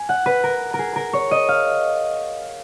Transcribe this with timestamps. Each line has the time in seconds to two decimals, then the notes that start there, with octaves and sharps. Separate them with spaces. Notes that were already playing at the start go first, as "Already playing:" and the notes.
Already playing: G#5
0.09 F#5
0.26 B4
0.44 A#4
0.74 A#4
0.79 G#4
0.96 A#4
1.13 C#5
1.31 D#5
1.49 F5